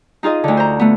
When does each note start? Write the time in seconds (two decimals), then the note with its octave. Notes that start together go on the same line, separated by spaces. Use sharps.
0.23 D#4 F4 G#4 D#5
0.44 D2 D3
0.57 C5 A#5
0.80 A3 B3